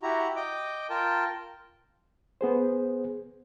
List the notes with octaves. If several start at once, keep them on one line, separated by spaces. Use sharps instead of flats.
E4 F#4 G4 A#5
D#5 G5 D6
F4 A#4 G5 A5
B3 G#4 C5